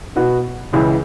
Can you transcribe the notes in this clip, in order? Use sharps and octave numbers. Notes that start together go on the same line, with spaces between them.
B2 B3 F#4
C#2 C#3 E3